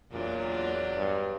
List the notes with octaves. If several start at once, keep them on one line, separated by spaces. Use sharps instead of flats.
E2 A#2 F#3 D4
G2